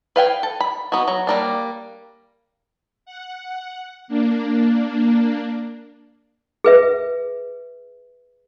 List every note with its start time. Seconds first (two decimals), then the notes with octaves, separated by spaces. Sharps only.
0.16 B4 F5 G5 G#5
0.43 A4
0.60 B5
0.92 B3 D#4 F#4
1.08 F#3
1.27 G3 A#3 D4
3.06 F#5
4.08 A#3 D4
6.64 G#4 B4 E5